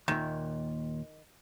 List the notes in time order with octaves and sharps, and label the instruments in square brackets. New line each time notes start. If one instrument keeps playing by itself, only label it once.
[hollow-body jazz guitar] D#2 A#2 E5 [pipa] D#3